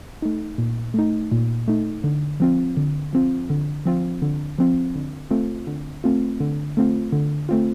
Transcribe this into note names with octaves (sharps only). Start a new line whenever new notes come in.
A3 D#4
A#2
A3 D#4
A#2
A3 D#4
D3
F3 C4 F4
D3
F3 C4 F4
D3
F3 C4 F4
D3
F3 C4 F4
D3
A3 C4 F4
D3
A3 C4 F4
D3
A3 C4 F4
D3
A3 C4 F4